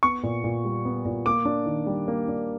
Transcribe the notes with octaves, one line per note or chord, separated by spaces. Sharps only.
B3 C#6
A#2
A#2
G3
B3
A#2
A#3 D6
D4
D#3
G3
A#3
D4